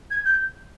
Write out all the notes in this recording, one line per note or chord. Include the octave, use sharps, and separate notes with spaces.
G#6
G6